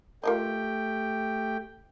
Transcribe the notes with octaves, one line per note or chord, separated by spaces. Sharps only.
A3 F4 G4 A#4 D#5 G5